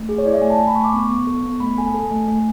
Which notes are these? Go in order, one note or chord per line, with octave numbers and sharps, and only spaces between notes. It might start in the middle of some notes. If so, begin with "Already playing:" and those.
Already playing: A3
G#4
C#5
E4 D5
E5
A3 G#5
A5
A3 G#5
B5
A3 C#6
D6
B3 C#6
B3
A4
B3
A3 B5
A4 G#5
A4
A3
A3